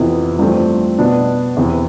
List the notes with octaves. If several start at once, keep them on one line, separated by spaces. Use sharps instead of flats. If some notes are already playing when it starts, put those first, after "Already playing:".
Already playing: F2 C3 E3 B3 E4
G2 F3 A3 C4
B2 B3 D4
E2 C3 E3